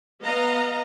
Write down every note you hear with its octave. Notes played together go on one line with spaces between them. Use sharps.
B3 D#5 F5 A#5